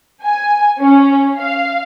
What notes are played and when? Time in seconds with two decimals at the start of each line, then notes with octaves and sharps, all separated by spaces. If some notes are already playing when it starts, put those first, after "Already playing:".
0.23 G#5
0.80 C#4
1.38 F5